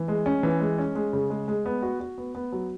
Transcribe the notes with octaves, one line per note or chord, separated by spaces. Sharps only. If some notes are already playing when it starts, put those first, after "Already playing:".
Already playing: E3
G#3
C#4
E3
G#3
C#4
G#3
C#3
G#3
G#3
B3
F#4
F#4
B3
B3
F#3